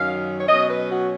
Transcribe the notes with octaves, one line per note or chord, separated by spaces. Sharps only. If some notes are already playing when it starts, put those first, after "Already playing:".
Already playing: F#2 D#3 F#3 C#4 F5
C#5
B2 F#3 C#4 D#5
B4
F#4